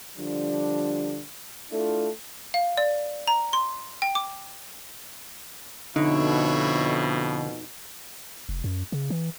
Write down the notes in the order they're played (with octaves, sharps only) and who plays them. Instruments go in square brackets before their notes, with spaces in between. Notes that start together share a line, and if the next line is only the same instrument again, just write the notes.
[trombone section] D3 F3 G3 D4
A3 D4 E4 F4 A4
[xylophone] F5
D5
A#5
C6
G5
D6
[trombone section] F2 B2 [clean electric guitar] D3 [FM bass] D#4 [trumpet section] E4 C#5
[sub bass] F1
F#2
C#3
E3